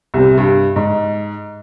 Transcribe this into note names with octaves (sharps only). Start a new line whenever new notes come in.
C2 C3
G2
G#2